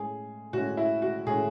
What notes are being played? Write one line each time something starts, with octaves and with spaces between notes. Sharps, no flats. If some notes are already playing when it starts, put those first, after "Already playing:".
Already playing: A2 G#3 C#4 G#4
A2 G#3 C#4 F#4
E4
F#4
A2 G#3 C#4 G#4